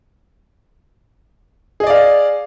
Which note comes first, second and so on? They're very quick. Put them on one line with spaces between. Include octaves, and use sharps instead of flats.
G#4 D#5 D5 F5